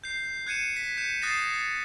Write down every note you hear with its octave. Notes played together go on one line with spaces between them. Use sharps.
G6 C7
F#6 G#6 C#7 D#7 E7
B6
G6 C#7 E7
D#6 F#6 A6 A#6 C7 E7